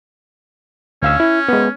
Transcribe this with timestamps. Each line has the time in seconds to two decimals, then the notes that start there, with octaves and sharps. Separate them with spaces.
1.03 D2 C#4 F5 E6
1.20 E4
1.49 G#3 B3